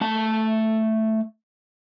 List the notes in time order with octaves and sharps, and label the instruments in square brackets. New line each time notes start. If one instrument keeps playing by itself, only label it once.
[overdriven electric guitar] A3 A5